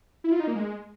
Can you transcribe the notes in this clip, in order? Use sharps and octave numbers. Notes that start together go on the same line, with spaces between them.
E4
F4
D#4
A#3
G#3